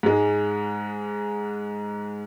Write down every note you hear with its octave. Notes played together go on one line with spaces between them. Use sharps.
G#2 G#3